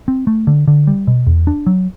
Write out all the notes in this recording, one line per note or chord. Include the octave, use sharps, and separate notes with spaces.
C4
A3
D3
D3
G3
B2
E2
D4
F#3